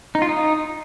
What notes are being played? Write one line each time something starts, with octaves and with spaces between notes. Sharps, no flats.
D#4
F4
D#4